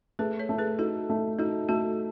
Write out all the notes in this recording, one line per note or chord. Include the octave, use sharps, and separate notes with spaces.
A3 G#4 B4
A4 C#5
A3
G#4 B4
D#4 F#4 A4
A3
D#4 F#4 A4
A3 F#4 A4